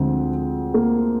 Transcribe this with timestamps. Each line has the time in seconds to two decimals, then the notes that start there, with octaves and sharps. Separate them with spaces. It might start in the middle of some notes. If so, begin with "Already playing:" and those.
Already playing: D2 D3 F3 G#3 C4
0.74 A#3